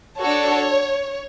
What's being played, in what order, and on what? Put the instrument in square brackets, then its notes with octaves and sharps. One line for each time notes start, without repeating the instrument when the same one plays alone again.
[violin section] D4 F#4 A4 C#5